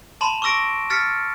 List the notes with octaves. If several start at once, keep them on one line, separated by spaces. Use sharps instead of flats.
A5 B5 C6 E7
C#6 D6 E6 A#6 D7
E6 F6 A6 B6 C#7